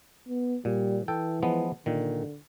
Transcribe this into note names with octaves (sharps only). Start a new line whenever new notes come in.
B3
A#2 G3
E3 A4 G5
F3 G#3 B3
A#2 D3 D#3